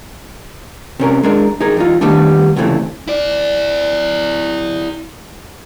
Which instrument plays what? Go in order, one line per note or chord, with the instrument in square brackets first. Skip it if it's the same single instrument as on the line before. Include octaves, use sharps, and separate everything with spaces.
[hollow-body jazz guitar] C3 C#4 A#4
G#3 D4 A#4
D#4 G#4 A#4
E2 D#4 F4
D#3 G3 A3 B3 D4
C#2 A2 C3 E3 G3 A3
[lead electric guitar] E4 D5